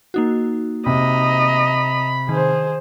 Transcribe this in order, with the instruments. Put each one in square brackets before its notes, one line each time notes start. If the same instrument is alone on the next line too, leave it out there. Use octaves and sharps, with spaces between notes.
[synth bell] A#3 D#4 F#4
[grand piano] C3 [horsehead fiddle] D#5 A#5 [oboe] B5
[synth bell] D#3 [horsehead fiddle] G#4 C5